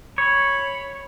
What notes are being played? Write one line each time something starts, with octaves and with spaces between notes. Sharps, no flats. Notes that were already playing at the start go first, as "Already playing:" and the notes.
C#5 B5